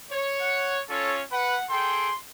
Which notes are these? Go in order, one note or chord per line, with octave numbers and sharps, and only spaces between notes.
C#5
F#5
C#4 F4 A4 C#5
B4 F#5
G#4 A4 G5 C6